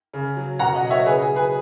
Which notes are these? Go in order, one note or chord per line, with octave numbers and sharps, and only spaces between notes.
C#3
F#3
B2 F#5 A#5
D#5 F#5
F#3
C#5 E5
C#3 G#4 B4
G#4
F#3
G#4 B4